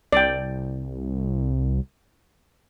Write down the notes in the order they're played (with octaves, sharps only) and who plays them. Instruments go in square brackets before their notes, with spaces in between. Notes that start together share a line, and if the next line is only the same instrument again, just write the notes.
[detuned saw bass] C2 [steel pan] D5 G5